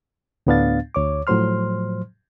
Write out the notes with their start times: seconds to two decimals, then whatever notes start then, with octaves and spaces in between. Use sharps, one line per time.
0.47 D2 A2 B3 D4 F5 A6
0.95 D2 C#5 D6
1.27 A2 F3 F#3 C5 C6 F6